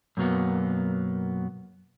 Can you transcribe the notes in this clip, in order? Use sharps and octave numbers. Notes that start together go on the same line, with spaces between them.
F#2 B2 F#3 A#3 B3